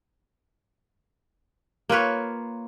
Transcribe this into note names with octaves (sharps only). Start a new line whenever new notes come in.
A#3 F4 B4 C#5